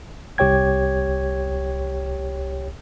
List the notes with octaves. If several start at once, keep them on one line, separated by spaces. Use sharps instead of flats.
C2 G4 C#5 G5 G#6